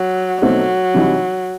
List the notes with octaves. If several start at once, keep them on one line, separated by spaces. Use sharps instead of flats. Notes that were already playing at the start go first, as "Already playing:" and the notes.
Already playing: F#3
B2 F#3 A3 C4 D#4 F#4
C3 E3 G3 D#4